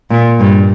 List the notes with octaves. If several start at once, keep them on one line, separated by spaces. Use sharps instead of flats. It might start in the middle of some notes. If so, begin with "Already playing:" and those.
A#2
G2